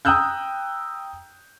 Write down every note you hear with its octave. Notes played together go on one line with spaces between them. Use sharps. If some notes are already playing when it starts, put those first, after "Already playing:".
G5 A#5 D#6 E6 F#6 G6